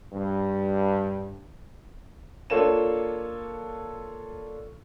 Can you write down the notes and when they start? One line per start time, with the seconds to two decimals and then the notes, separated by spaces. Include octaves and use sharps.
0.13 G2
2.50 A#3 D4 F4 A4 C#5 E7